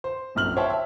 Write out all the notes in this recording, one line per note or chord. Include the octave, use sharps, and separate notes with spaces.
C5
F1 A#1 F#2 F6 F#7
C5 C#5 E5 G5 A5
E5